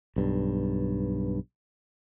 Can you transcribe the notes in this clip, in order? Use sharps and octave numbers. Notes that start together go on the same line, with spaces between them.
B1 G2